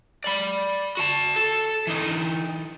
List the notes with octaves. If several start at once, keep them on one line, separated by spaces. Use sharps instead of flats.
D5 B5
F#4 A5
A4
E3 D#4